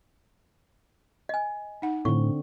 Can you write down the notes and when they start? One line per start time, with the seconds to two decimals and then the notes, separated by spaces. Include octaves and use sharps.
1.29 D#5 G#5
1.82 D#4 F#5
2.05 A2 D3 C4 C#6